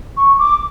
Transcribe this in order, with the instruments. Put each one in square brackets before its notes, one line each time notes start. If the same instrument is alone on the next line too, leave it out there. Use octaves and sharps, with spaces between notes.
[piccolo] C#6
D6